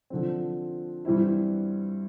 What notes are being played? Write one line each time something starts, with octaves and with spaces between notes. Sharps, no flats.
D3 F3 C4
G2 E3 G3 C4 E4